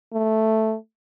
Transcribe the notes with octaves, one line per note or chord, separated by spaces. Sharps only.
A3